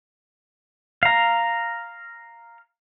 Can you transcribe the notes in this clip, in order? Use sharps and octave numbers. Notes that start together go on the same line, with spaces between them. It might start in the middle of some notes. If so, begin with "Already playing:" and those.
F5 A#5